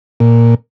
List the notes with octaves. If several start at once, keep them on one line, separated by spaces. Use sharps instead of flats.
A#2